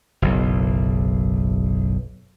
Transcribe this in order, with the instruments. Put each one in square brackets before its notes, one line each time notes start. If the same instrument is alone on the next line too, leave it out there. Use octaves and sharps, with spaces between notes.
[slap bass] F#1 B1